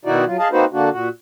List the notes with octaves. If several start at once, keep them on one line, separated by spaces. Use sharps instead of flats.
B2 D#3 D#4 E4 F#4 D5
F#3 F4
G#4 D#5 F5 A5
A#3 C4 D#4 F#4 B4 C5
D3 A#3 D4 F#4
A#2 F#4